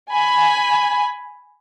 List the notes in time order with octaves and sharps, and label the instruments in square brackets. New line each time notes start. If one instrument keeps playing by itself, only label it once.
[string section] G#5 B5